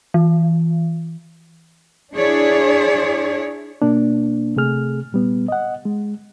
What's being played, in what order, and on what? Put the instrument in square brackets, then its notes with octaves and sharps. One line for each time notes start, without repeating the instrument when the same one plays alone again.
[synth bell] E3
[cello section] D4 E4 G#4 C#5 D5
[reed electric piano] B2 A#3 D4
C3 A3 G#4 F6
A#2 G3 B3
D#5 F#5
G#3